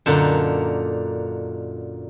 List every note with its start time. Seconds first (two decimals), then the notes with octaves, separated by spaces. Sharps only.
0.06 F#2 A#2 D3 D#4